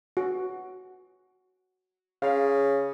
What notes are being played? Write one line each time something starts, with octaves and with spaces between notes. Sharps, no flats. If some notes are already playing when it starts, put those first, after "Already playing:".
F#4
C#3 F5